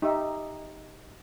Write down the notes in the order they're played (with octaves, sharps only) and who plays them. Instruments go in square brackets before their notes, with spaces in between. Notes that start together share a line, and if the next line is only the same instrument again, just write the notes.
[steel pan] D#4 G4 E5